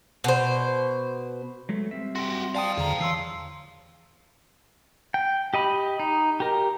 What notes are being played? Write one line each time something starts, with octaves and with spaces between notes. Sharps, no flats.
B2 C5
F#3 G#3 A3
G3 C4 E5
F#4 G4 C6
D5 F5 G5 A5 D#6
E2 D3 G#4 A#5
E3 C#5 C6 E6 C7
G5
G4 D#5 B5
D#4
G4 A#4